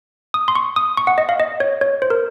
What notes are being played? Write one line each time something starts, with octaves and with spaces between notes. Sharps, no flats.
D#6
C6
C#6
D#6
C#6
F#5
D#5
F5
D#5
C#5
C#5
C5
A#4